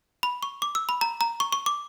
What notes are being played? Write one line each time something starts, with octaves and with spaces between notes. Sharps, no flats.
B5
C#6
D6
E6
B5
A#5
A#5
C#6
C#6
D6